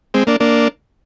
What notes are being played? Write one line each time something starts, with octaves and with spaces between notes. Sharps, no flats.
G#3 C4
A#3 D4
A#3 D4